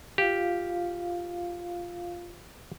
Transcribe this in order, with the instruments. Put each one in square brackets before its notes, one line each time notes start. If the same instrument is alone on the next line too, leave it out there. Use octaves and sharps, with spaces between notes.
[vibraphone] F4 F5 [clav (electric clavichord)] G4